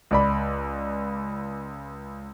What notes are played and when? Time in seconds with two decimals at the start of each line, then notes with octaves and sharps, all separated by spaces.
0.11 C#2 D5 B5